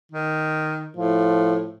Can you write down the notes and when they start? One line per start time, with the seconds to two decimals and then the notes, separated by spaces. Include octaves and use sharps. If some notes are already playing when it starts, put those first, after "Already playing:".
0.12 D#3
0.97 A2 F3